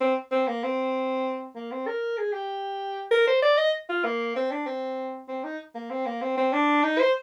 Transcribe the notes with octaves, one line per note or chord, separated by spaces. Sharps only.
C4
C4
A#3
C4
A#3
C4
A#4
G#4
G4
A#4
C5
D5
D#5
F4
A#3
C4
D4
C4
C4
D#4
A#3
C4
A#3
C4
C4
D4
D#4
C5